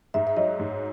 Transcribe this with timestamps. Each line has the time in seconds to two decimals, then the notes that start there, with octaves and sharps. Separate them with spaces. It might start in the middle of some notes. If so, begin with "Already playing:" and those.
0.14 G#2 E5
0.27 E5
0.37 F#3 D#5
0.59 G#2